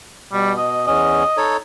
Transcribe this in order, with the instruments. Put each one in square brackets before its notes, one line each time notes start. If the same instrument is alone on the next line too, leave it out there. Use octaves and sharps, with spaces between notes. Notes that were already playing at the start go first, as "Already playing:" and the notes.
[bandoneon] B2 [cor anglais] G3
[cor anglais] D#5
[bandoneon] E2 C#4 [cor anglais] D#5
[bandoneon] D#4 A4 C#5